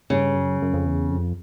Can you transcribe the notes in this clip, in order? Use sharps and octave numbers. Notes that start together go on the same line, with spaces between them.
G2 C#3
F#2
F#2
F2
E2
F2